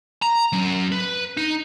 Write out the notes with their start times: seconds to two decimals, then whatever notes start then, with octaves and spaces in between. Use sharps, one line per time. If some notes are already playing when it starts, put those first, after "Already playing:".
0.22 A#5
0.52 F#3 C#4
0.92 B4
1.37 D#4